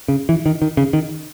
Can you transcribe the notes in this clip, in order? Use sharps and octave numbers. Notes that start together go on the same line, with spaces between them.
C#3
E3
D#3
D#3
C#3
D#3